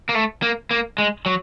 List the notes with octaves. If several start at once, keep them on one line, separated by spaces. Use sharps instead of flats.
A#3
A3
A#3
A#3
G#3
F#3